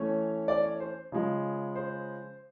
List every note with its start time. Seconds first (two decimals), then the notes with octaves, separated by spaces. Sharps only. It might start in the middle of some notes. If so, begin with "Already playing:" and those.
Already playing: E3 A3 C#4 C#5
0.48 D5
0.64 C#5
0.80 C5
1.12 C#3 F3 G#3
1.75 C5